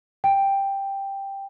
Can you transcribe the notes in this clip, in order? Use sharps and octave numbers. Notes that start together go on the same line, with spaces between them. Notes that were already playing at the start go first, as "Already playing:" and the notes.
G5